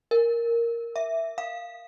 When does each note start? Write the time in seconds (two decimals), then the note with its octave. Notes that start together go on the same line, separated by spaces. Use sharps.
0.11 A#4
0.96 E5
1.38 F5